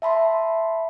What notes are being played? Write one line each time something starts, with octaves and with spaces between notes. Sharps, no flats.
E5 A5 B5 C6